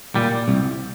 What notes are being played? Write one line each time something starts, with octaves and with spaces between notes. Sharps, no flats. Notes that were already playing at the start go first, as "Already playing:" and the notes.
A#2 G3
C2